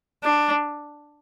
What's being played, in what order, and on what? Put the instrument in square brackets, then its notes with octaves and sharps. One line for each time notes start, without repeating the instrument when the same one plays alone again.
[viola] D4